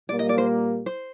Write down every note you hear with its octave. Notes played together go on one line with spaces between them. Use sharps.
A#2 G3 A#3 D5
D#5
D5
C5
C5